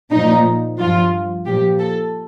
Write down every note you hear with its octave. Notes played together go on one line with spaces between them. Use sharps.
A#2 F3 D#4
G2 F3 F4
A#2 F3 G4
A4